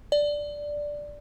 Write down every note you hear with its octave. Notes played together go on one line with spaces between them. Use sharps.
D5